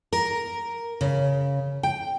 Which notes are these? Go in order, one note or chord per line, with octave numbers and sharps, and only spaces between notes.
A#4
C#3
G5